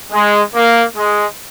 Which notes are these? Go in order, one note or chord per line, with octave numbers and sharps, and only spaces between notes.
G#3
A#3
G#3